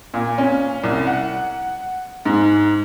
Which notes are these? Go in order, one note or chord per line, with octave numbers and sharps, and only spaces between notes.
A#2
C#4
C2
F#5
G#2